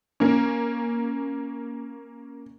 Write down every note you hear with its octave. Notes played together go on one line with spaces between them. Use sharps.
A#3 C#4